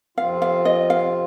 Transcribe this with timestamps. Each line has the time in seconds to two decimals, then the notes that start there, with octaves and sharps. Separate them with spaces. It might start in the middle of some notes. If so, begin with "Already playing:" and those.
0.17 F2 C3 F3 C4 F4 F5
0.42 F5
0.65 D#5
0.90 F5